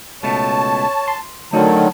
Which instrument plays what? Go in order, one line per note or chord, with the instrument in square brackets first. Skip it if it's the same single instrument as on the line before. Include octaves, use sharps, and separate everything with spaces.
[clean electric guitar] C#2 B2 A3 [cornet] C#5 [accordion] A5
[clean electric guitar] C6
[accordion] D3 D#3 F#3 [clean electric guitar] A3 D#4 F#4 [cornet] A5